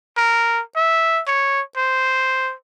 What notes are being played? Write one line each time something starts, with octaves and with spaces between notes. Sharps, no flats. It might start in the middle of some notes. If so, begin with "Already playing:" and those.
A#4
E5
C#5
C5